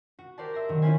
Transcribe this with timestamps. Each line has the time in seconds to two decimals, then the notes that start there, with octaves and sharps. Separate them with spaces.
0.19 F#4
0.38 G4 A#4 C5 D5 A5
0.54 E5 C6 A#6
0.69 D#3 F#3
0.82 C#4 E4 F4 B4 C5 G#5